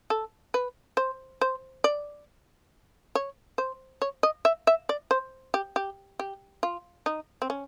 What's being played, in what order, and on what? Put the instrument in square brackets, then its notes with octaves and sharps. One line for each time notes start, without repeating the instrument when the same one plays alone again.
[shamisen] A4
B4
C5
C5
D5
C#5
C5
C#5
D#5
E5
E5
D5
C5
G4
G4
G4
F4
D#4
C4
C#4